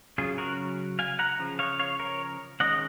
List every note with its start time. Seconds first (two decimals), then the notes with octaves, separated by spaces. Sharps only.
0.18 C#3 F#3 C#4 F4 G#4
0.38 F#4 A#4
0.99 F5 G#5
1.19 F#5 A#5
1.39 C#3 F3
1.59 C#5 F5
1.79 C#5 F5
2.00 A#4 C#5
2.60 D#3 G#3 C#4 D#5 F#5